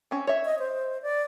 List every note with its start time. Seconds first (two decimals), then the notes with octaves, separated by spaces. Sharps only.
0.11 C4 C#4
0.27 C#5 E5
0.45 D#5
0.59 C5
1.02 D5